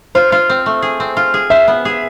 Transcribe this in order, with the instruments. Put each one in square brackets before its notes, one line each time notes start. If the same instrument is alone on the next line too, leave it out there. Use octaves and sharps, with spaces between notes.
[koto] F4 [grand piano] C5
[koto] F4
C4
A3
G#4
C4
F4
G#4
[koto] C5 [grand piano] E5
[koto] B3
G#4